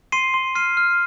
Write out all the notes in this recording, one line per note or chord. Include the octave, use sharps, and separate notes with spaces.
C6 C7 D#7
C6
F6 C7 D#7
F6